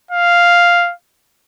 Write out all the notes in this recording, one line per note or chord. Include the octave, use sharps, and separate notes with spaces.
F5